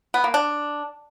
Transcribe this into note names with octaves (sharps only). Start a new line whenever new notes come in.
B3
A#3
D4